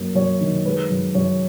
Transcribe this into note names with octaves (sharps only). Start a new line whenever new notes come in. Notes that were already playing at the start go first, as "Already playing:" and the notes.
Already playing: F#2 A#3
F#2 C#5
D#3
G#3 B4
F#2
F#2 C#5